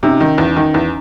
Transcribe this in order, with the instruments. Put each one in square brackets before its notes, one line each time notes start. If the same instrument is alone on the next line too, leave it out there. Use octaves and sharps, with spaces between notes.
[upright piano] C3 [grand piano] C#4 D#4
[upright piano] D#3
E2
D#3
E2